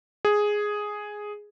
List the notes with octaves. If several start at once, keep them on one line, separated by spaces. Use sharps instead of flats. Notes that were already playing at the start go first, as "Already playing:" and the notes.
G#4